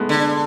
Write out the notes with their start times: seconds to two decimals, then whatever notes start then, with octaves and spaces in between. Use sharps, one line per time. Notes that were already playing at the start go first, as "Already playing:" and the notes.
Already playing: G#3 A3 B3
0.09 D3